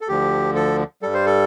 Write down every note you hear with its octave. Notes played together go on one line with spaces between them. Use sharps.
A4
D2 D3 F3 G4
A4
G2 G3 A4
C5
A4